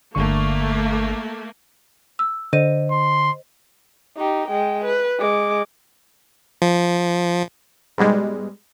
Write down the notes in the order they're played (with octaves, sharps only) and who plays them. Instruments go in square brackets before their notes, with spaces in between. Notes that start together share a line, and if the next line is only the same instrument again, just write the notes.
[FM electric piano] G1 D3 C#6 [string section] A3 A#3
[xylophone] E6
[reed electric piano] D3 [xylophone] C5 D#5 D#7
[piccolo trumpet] C6
[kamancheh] D#4 G4
G#3 G5
B4
G#3 D6
[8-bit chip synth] F3
[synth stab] G#2 B2 G3 G#3